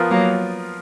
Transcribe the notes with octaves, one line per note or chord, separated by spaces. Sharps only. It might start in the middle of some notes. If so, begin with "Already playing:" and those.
Already playing: F3 B3 F4 A#4
F#3 A#3